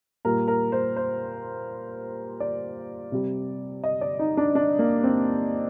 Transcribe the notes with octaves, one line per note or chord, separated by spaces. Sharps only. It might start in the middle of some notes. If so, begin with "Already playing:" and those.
A#2 G3 A#4
A#4
C5
C5
D5
C3 G3
D#5
D5
D#4
D4
D4
A#3
C4